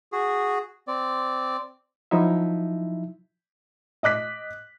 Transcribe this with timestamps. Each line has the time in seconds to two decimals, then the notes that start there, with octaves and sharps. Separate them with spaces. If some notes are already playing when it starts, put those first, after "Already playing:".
0.12 F#4 G#4
0.88 C4 D5
2.11 F3 F#3 D#4 E4 E5
4.03 D#5 D6 F#6 B6